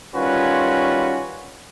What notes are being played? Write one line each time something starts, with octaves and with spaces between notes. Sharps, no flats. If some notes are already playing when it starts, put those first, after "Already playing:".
D#3 G3 C#4 F4 F#4 B4